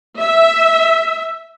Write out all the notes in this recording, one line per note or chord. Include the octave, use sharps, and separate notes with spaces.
E5